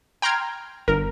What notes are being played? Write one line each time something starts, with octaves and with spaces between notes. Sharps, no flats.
G5 A#5 C6 F6 G#6
G1 A#4